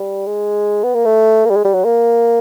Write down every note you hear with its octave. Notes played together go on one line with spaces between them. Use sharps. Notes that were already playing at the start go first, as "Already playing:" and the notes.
Already playing: G3
G#3
B3
A#3
A3
A#3
G3
G#3
G3
F#3
A#3